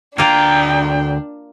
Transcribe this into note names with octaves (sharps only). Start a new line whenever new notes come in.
D2 A#3 D4 F4 G5 A#5